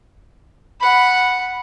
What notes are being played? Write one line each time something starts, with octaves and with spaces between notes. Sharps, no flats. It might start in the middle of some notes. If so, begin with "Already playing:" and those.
F#5 B5